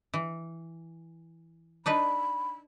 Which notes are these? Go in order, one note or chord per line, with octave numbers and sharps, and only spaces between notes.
E3
D4 D#4 B4 B5